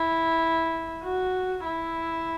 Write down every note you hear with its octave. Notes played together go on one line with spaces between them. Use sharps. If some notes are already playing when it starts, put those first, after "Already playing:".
Already playing: E4
F#4
E4